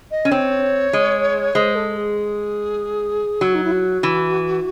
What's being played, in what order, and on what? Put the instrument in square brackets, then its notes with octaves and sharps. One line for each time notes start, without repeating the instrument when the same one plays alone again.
[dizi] D#5
[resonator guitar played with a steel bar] C#4
[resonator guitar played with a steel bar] C4 [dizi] C#5
[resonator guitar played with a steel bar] G#3
[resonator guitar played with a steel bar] G#3 [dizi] C5
[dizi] A4
G#4
[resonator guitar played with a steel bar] F#3 [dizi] F#4
[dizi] D#4
E4
F#4
[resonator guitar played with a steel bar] E3